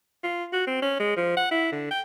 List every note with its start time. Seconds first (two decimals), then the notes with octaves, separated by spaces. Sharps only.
0.23 F4
0.53 F#4
0.67 C4
0.82 C#4
0.99 G#3
1.16 F3
1.37 F#5
1.51 E4
1.72 D3
1.91 G5